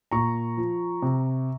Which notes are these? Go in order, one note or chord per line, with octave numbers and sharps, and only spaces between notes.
A#2 A#5 C#6
F3
C3